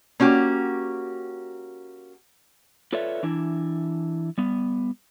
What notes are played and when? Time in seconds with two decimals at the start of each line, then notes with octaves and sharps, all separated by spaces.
0.20 A#3 C#4 F#4 G4
2.93 F4 A4 B4 C#5 D5 E5
3.23 E3 D4 E4
4.38 G3 B3